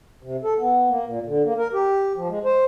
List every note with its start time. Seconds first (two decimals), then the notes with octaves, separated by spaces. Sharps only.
0.23 C3
0.44 A4
0.59 B3
0.89 A#3
1.07 A#2
1.27 D3
1.45 A#3
1.58 A#4
1.73 G4
2.16 F3
2.29 G#3
2.45 C5